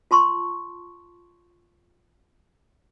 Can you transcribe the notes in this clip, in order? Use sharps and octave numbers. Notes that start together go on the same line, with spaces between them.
F4 A5 C6 C#6